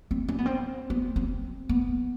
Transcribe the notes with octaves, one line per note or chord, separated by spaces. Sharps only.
C4
C#4
B3
C4
B3
C4
B3